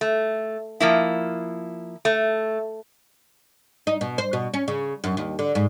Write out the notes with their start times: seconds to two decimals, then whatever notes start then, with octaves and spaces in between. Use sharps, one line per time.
0.01 A3
0.80 F3 A#3 E4
2.05 A3
3.87 D#4
4.01 B2
4.18 C5
4.33 B2
4.54 C#4
4.68 C#3
5.04 F#2
5.17 D#2
5.39 D3
5.55 G#2